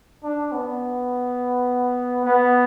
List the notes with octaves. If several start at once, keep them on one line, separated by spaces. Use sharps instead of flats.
D4
B3
B3